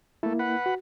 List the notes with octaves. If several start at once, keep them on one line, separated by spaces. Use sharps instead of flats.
A3 A#3 E4
B4 F#5
F#4